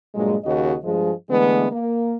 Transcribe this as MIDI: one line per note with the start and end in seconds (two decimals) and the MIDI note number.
0.15 0.36 43
0.15 0.36 46
0.15 0.36 54
0.15 0.36 56
0.45 0.75 39
0.45 0.75 49
0.45 0.75 66
0.45 0.75 75
0.84 1.12 43
0.84 1.12 53
0.84 1.12 56
1.29 1.66 50
1.29 1.66 52
1.29 1.66 56
1.29 1.66 57
1.29 1.66 59
1.72 2.17 58